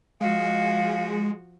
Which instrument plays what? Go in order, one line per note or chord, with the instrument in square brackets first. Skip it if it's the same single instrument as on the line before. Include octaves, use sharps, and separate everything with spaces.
[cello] F3 F#4 [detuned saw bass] G#3 [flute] F5